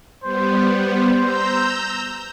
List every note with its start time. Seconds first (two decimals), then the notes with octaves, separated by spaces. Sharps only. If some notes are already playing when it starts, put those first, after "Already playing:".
0.23 G3 B3 C5
1.22 A#5 E6 G6